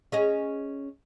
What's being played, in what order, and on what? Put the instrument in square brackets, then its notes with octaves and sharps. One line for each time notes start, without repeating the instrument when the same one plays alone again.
[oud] C#4 G#4 D#5